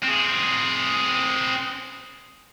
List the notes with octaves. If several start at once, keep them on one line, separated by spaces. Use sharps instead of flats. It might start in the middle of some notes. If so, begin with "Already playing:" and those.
C4 G#4